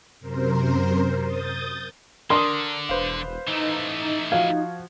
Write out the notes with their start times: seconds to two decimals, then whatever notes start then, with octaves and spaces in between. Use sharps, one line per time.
0.20 F#2 C3 A#4 C5
1.22 D#6 G6 A6
2.30 D3 D4 A#4 C6 D#6
2.89 E1 B4 C5 F5
3.47 E3 A3 D#4
4.32 F3 F#4 F5 G#6